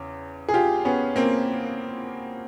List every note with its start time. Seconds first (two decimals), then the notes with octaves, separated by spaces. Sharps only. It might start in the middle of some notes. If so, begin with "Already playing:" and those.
Already playing: E2 C#3
0.49 G#4
0.54 F4 G4
0.85 B3 C#4
1.16 A#3 C4